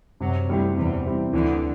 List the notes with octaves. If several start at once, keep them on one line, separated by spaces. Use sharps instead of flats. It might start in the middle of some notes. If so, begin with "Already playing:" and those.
F#2 C3 F#3
D2 D3 G3 C4 E4 G4
E2 C3 E3
G3 C4 E4 G4
D2 D3 E3